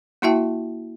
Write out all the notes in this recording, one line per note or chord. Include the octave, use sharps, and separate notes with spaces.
A#3 E4 F#4 E5 G5 A5